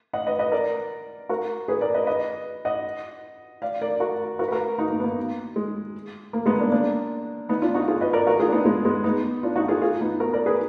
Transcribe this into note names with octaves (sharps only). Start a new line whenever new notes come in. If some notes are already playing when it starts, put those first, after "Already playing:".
D#5 F#5
B4 D#5
B4 D#5
A#4 D5
F#4 A#4
G#4 B4
A#4 D5
B4 D#5
B4 D#5
D#5 F#5
D5 F5
A#4 D5
F#4 A#4
F#4 A#4
B4
F#4 A#4
D#4 F#4
A#3
B3
A#3
G#3
A#3
G#3 B3
A#3 D4
A#3 D4
B3 D#4
D4 F4
D#4 F#4
F4 G#4
B4 D#5
A#4 D5
F#4 A#4
F4 G#4
D4
B3 D#4
G#3 B3
G#3 B3
B3 D#4
D4 F4
D#4 F#4
F4 G#4
F4 G#4
B3 D#4
F#4 A#4
A#4 D5
G#4 B4